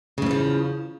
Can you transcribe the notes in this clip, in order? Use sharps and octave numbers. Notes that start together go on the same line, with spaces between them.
E2 G#2 C#3 F3